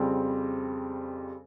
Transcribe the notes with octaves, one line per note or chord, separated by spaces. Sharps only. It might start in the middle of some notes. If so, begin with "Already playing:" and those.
Already playing: F2 C#3 G3 C4